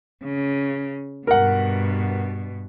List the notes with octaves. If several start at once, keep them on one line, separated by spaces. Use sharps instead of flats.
C#3
G2 B2 A#4 F#5